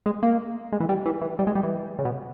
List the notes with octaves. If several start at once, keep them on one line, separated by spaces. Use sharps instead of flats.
G#3
A#3
G#3
E3
G3
E3
E3
G3
G#3
G3
E3
C#3
B2